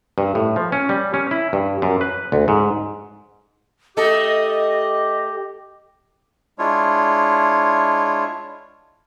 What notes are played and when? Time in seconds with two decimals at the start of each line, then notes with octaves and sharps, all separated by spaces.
0.18 G2
0.35 A2
0.56 F3
0.72 C#4
0.89 G3
1.14 C#4
1.31 E4
1.53 G2
1.82 F#2
2.01 B4
2.32 D2
2.48 G#2
3.97 A3 G4 A4 D#5
6.59 G#3 D4 E4 F4 C#5